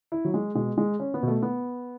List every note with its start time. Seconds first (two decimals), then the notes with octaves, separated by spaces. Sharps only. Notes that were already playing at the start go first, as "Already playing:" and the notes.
0.12 E4
0.25 F#3
0.34 G#3
0.55 B2 G#3
0.78 G#3
1.00 C#4
1.14 B3
1.23 B2
1.28 A3
1.42 B3